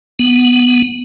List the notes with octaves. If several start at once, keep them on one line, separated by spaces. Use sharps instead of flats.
B3